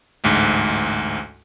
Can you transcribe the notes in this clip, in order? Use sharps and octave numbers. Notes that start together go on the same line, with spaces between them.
A1 D2 G#2